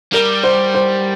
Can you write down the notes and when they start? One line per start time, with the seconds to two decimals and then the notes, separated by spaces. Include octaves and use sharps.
0.13 G3 A#4
0.43 C5
0.74 C5